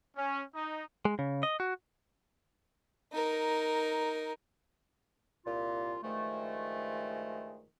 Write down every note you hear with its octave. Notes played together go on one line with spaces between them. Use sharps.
C#4
D#4
G#3
C#3
D#5
F#4
D#4 A#4
C2 A#2 F4
G2 D#3 F3 G#3 A3